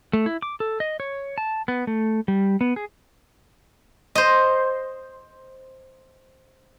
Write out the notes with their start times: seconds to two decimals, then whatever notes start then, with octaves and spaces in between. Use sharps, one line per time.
0.13 A3
0.26 E4
0.42 D6
0.60 A4
0.80 D#5
1.00 C#5
1.38 A5
1.68 B3
1.87 A3
2.28 G3
2.61 B3
2.76 G#4
4.15 C5 D#5